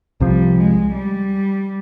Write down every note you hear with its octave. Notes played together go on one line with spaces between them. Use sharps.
C2 C3 F3 G3
G#3
G3